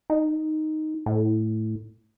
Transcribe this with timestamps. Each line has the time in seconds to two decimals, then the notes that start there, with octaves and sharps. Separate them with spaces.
0.10 D#4
1.06 A2